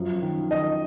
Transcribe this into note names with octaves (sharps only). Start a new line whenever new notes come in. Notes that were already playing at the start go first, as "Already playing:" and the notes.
Already playing: F#2 F3
D#3
D#3 D#5